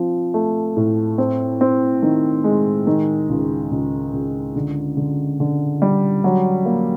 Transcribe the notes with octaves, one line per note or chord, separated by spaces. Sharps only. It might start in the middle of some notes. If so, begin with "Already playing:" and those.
Already playing: F3 C4
A3
A2
C4
C4
D#3
G#3
D#3
C#2
C#2
C#2
D3
D3
D3
G3
F#3
A#3